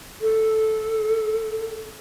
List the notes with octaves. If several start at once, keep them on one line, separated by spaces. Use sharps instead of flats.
A4